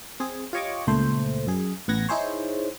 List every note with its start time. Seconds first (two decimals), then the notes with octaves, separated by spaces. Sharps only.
0.20 C4 G#4
0.53 F4 G4 C#5 D#5 C#6 D6
0.87 C#2 A#2 A3 C5
1.47 F#2 G#4
1.88 A1 B3 F#5 G#6 A#6
2.09 D#4 E4 G#4 C5 C#5